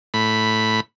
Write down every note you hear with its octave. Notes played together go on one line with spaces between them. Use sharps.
A2 B5